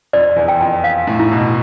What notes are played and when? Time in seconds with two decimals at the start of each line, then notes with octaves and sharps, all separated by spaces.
0.13 F2 D5
0.36 E2
0.48 G5
0.61 F2
0.84 F5
1.07 A2
1.20 E4
1.31 B2